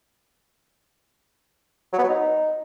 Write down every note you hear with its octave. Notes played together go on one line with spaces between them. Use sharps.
F#3
B3
F#3
D#4